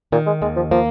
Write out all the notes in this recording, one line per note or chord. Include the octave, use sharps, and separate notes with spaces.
A#2 D#3
G#3
D#2 G#3
F3
F3 A#3